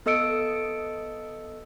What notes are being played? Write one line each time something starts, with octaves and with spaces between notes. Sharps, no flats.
B3 A4 D#5 E6 C#7 D7